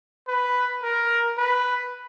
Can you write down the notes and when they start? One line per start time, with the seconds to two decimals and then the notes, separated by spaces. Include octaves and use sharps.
0.28 B4
0.83 A#4
1.38 B4